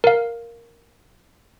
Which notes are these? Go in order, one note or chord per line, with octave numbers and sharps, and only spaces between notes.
A#4 F5